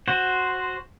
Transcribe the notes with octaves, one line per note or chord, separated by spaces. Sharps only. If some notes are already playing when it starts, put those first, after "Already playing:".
F#4 C5